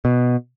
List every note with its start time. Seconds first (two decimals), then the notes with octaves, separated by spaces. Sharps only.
0.05 B2